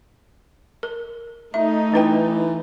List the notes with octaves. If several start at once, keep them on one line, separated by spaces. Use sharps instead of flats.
A#4
A3 D#4 E5
E3 D4 B4 G5